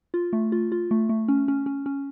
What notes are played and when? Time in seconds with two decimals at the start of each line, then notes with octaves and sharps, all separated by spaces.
0.14 F4
0.33 A3
0.52 F4
0.72 F4
0.91 A3
1.09 A3
1.28 C#4
1.48 C#4
1.66 C#4
1.86 C#4